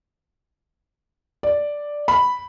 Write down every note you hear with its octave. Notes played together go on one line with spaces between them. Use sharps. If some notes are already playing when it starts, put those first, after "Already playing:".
D5
B5